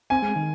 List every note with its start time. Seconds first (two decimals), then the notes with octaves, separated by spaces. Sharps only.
0.10 C4 G#5
0.22 G#3
0.36 D#3